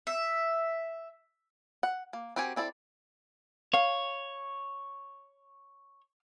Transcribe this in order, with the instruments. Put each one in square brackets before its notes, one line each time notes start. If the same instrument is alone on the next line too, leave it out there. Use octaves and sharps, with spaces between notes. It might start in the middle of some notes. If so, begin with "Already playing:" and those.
[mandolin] E5
[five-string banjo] F#5
A#3
C4 F#4 G4 A#4 G#5
C4 E4 A4 D5
[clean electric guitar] C#5 [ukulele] F5